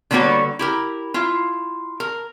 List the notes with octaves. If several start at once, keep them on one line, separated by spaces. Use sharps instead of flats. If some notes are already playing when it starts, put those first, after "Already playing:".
D3 G3 A#3 B3 F#4 C#5
E4 G4 A#4
E4 F4
A#4